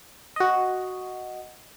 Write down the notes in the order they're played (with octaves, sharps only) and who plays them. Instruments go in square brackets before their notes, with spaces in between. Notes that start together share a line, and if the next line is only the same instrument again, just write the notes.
[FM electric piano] F#4 D#5